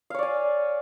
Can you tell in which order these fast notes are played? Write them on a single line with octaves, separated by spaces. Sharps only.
F5 C#5 D5 G#5